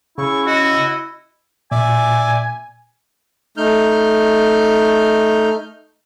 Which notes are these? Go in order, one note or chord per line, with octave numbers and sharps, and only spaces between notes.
C#3 E4 C#6
F#4 D#5
A#2 D5 E5 G#5
A3 D#4 F6 G6